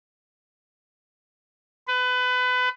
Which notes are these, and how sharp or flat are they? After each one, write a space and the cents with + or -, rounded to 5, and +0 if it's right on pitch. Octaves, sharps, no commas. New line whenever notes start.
B4 +25